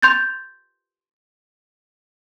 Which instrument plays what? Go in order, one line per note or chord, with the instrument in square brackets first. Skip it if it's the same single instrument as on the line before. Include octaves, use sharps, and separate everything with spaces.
[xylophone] C6 G6 A6